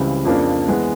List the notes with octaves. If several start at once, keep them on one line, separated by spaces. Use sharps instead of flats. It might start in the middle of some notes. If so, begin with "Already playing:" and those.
Already playing: C#2 C#3 E3 G3 C4
F2 C#3 F3 A#3 D4
E3 G#3 B3